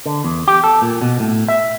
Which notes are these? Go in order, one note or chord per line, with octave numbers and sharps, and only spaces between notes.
D3
E2
G4
A4
A#2
B2
A2
E5